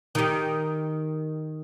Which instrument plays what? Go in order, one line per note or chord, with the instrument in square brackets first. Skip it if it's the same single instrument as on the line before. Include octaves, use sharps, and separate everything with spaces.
[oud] D#3 G4